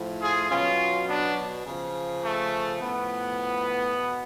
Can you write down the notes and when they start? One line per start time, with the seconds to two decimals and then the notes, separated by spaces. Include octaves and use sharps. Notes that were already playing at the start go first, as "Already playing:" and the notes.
Already playing: A2 F3
0.21 F4 G#4
0.49 B2 F#3 C#4 F4
1.07 B3 D4
1.65 C#3 F3
2.22 A3
2.80 A2 F3 B3
3.95 B2